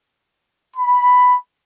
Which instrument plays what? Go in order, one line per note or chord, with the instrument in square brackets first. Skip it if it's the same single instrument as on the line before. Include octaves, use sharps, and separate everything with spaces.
[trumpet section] B5